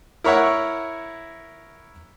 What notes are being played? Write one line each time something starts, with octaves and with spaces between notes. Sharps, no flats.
E4 A#4 C#5 E5 F#5